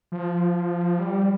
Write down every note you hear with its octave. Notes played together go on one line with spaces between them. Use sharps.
F3
G3